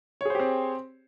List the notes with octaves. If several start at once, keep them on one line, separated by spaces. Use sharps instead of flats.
C4 G4 G#4 C5 C#5